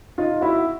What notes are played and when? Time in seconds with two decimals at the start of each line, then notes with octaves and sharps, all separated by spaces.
0.18 D#4 F4
0.41 E4 F#4